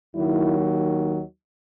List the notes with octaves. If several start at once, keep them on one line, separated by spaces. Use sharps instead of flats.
D#2 D#3 F#3 E4